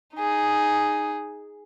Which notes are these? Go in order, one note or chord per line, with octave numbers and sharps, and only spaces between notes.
D#4 G#4